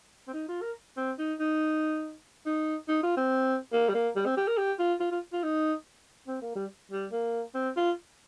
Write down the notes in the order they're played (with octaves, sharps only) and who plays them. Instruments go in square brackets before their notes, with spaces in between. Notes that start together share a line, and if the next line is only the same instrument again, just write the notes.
[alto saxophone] C4
D#4
F4
A#4
C4
D#4
D#4
D#4
D#4
F4
C4
A#3
G3
A#3
G3
C4
G4
A#4
G4
F4
F4
F4
F4
D#4
C4
A#3
G3
G3
A#3
C4
F4